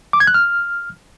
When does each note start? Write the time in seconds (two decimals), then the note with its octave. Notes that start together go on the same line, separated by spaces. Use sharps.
0.13 D6
0.20 G#6
0.27 F#6
0.34 F6